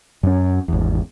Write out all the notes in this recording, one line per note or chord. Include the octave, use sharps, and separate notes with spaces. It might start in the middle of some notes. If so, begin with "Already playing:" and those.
F#2 C#4
G#1 E2